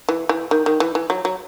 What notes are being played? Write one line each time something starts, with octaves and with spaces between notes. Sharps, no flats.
E3
E3
D#3
D#3
E3
E3
F#3
F#3